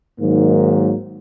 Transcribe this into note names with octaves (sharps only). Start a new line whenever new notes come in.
G#2 D#3 F#3 A#3